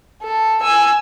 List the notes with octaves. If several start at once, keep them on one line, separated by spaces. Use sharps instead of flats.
A4
G#5 E6